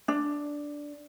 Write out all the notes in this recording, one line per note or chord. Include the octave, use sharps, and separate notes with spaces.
D4